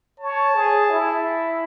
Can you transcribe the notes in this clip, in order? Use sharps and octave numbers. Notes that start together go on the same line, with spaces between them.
C#5 A5
G#4
E4